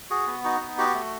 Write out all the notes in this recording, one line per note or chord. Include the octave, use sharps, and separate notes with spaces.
F#4 G#4
B3
D#4 F#4
B3
F#4 G4
A3